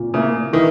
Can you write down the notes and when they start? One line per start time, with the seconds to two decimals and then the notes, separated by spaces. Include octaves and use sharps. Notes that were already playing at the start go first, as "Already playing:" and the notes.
Already playing: A#2
0.14 C#3 A#3 E4
0.53 D#3 E3